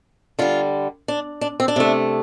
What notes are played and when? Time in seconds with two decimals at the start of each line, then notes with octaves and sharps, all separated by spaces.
0.39 D3 G3 F4
1.08 D4
1.41 D4
1.60 C4
1.68 D4
1.76 C3 A3